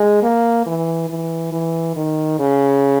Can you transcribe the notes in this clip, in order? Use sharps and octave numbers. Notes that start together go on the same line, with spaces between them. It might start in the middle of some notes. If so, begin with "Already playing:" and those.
Already playing: G#3
A#3
E3
E3
E3
D#3
C#3